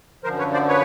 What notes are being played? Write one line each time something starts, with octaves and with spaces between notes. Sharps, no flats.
F#2 D3 F3 A#4 C5
B4 C#5
C5 D5
B4 C#5